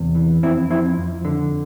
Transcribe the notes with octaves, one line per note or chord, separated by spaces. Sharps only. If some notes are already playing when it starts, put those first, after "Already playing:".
Already playing: E2 C3
E3
F2 C4 E4
F3 C4 E4
F2
D3